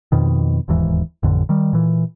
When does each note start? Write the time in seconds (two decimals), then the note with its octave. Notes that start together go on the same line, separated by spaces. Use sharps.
0.12 F2 B2 D#3
0.68 E1 D#2 G#2 E3
1.23 A1 F2 D3
1.49 D#3 G3
1.73 A#2 E3